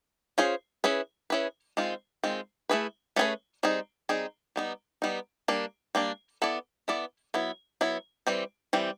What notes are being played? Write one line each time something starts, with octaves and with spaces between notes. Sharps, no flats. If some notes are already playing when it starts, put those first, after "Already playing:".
C#4 F4 G#4 C5
C#4 E4 G#4 B4
C#4 E4 G#4 B4
D#3 G#3 C4 F4
D#3 G#3 C4 F4
A3 C#4 E4 G#4 B4
A3 C#4 E4 G#4 B4
G3 C4 D#4 G#4
G3 C4 D#4 G#4
G3 B3 D#4
G3 B3 D#4
G3 A#3 D4
G3 A#3 D4
B3 E4 A4 D5
B3 E4 A4 D5
F#3 B3 E4
F#3 B3 E4
E3 G3 C4
E3 G3 C4